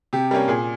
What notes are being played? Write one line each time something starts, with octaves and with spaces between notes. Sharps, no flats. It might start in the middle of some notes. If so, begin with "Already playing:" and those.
C3 G4
G3 A#3 C#4
A#2 G#4